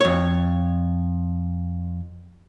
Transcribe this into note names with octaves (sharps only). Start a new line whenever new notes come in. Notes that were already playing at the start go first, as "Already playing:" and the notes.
F2 C#5